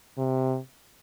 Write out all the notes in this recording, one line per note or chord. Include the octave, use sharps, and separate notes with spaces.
C3